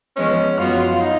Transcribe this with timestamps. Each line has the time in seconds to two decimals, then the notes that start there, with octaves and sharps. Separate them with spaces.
0.16 F3 G#3 B3 C#4
0.58 F#2 F3 B3 F4 F#4 C#5
0.79 F4
0.95 F4
1.01 D#4